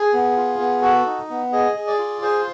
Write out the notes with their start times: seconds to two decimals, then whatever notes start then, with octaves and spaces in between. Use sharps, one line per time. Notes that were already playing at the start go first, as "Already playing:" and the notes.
Already playing: G#4
0.13 B3
0.37 F4
0.59 B3
0.82 F#4 A4
1.06 D#4
1.30 B3
1.52 G#4 D#5
1.76 G#4
1.87 D5
1.98 F4
2.22 G#4 C5